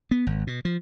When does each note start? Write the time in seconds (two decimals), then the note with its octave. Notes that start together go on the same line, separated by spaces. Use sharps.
0.11 B3
0.27 G#1
0.47 B2
0.65 F3